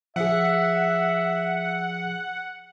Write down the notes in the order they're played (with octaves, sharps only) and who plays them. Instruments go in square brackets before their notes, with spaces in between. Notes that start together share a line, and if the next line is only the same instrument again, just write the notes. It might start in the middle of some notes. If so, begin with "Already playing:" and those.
[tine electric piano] F3 G#4 [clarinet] E5 [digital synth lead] F#5